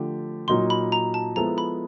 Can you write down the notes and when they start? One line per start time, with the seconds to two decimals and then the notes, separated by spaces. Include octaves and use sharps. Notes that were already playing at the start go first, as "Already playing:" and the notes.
Already playing: D3 F3 A3 D4 G4
0.48 A#2 F#3 A#3 D#4 F#4 C6
0.70 B5
0.92 A#5
1.14 A5
1.36 F3 G#3 B3 E4 A4 A#5
1.58 B5